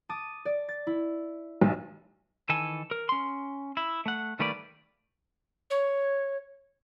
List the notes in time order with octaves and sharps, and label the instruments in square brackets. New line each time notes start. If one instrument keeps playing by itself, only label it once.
[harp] A5 D6 D#6
D5
A6
E4
[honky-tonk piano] B1
[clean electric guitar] D#3 E3 A4 G#5
A#4
C#4 C6
E4
A3 F#5
D#3 G3 A3 A#3 B4 D5
[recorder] C#5